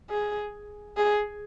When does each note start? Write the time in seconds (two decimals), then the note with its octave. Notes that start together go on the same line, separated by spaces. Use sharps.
0.10 G#4
0.97 G#4